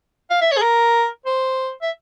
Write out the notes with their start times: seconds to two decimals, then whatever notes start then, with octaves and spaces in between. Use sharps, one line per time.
0.31 F5
0.41 E5
0.52 C#5
0.57 G#4
0.62 A#4
1.26 C5
1.82 E5